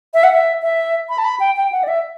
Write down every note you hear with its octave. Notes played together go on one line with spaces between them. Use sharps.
E5
F#5
E5
E5
B5
A5
B5
G5
G5
F#5
D5
E5